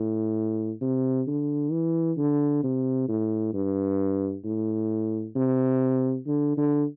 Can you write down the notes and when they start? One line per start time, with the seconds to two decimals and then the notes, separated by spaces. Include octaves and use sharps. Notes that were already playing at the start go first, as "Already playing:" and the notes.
Already playing: A2
0.81 C3
1.27 D3
1.71 E3
2.18 D3
2.64 C3
3.08 A2
3.54 G2
4.44 A2
5.36 C3
6.27 D3
6.57 D3